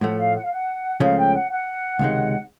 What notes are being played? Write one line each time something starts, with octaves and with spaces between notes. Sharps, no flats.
A2 F3 A3 F#5
F5
F#5
F5
F#5
C#2 C#3 F3 A3 F5
G5
F#5
F#5
C#2 C3 D#3 G#3